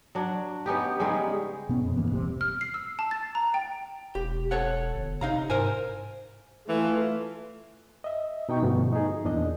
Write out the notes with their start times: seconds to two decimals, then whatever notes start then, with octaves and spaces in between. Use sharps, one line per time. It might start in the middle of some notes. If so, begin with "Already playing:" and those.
0.15 F#3 D4
0.66 B3 C#4 D#4 G4
1.00 C#3 G3 G#3 D#4
1.69 B2 B3 C#4
1.82 F2 B2
1.96 G#2 E3 A#3 B3
2.11 E1 C2 C3
2.41 F6
2.61 C7
2.74 E6
2.99 A5
3.11 A6
3.35 A#5
3.54 G5
4.15 E1 G4
4.51 A4 C#5 F#5
4.95 G1
5.21 C3 D#4 F5 A#5
5.50 G#2 A#4 C5 G#5
6.69 E3 A3 F4
8.04 D#5 E5
8.49 B2 D#4 G5 C#6
8.62 G2 B2 D3 F3 A3
8.93 D#4 G#4
9.25 E2 A#2 D4 D#5